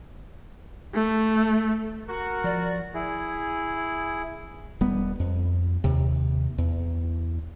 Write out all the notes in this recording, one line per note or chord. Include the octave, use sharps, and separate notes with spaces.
A3
F#4 A#4
F3 D5
E4 G#4
E1 G3 B3
F2
D#2 C3
E2